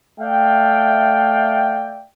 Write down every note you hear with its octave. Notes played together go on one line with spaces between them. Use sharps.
A3 D5 E5 F5 G5